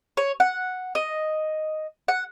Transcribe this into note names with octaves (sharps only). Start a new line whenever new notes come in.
C#5
F#5
D#5
F#5